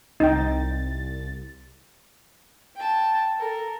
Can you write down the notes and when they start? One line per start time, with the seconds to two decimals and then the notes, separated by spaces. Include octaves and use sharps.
0.20 C2 D#4 G5 A6
2.76 G5 A5
3.37 A4 A#4